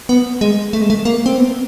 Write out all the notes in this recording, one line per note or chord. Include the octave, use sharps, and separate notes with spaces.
B3
G#3
A3
G#3
A3
A#3
C4
B3